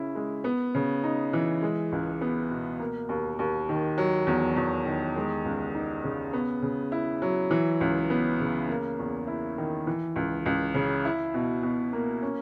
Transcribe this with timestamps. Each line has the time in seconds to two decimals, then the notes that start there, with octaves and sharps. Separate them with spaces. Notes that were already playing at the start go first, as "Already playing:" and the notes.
Already playing: C#3 C#4 E4
0.15 G#3
0.44 B3
0.75 C#3
1.04 D#4
1.33 E3
1.63 G#3
1.92 C#2
2.21 B3
2.50 B2
2.80 A#3
3.09 D#2
3.39 D#2
3.69 D#3
3.98 F#3
4.27 E2
4.56 E2
4.86 D#3
5.16 G#3
5.45 C#2
5.75 D#4
6.04 C#3
6.33 B3
6.62 C#3
6.92 E4
7.22 F#3
7.51 E3
7.81 C#2
8.10 B3
8.40 C#3
8.68 A#3
8.99 E2
9.27 E4
9.58 D#3
9.87 E3
10.16 C#2
10.46 C#2
10.74 C#3
11.05 E4
11.34 B2
11.63 B2
11.93 A#3
12.22 C#4